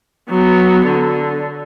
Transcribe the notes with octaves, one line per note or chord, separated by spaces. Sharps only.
F#3 B3
D3